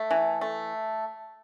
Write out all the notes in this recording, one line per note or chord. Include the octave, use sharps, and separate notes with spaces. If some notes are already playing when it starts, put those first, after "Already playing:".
Already playing: A3 E5
E3
A3